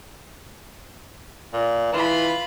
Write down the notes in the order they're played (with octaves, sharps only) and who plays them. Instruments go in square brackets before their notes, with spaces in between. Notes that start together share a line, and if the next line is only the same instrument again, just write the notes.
[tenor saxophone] A#2
[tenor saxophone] E3 [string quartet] F4 B5